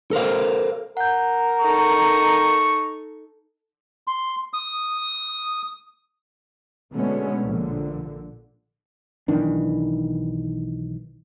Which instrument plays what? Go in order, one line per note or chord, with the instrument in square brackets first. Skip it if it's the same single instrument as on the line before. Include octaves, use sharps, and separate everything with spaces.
[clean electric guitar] A4 A#4 C5 F5
[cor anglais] A#4 [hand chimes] F#5 G6
[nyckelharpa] D#4 A4 [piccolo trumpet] C#6
[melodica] C6
D#6
[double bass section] B2 D3 G#3 A3 B3 C#4
A#1 D3
[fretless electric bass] B1 D#3 E3 D4